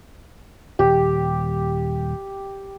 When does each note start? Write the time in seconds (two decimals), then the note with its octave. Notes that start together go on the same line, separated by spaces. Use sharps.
0.79 D#1 G4